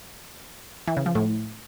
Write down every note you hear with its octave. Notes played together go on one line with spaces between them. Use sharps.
E3
C#3
F3
A2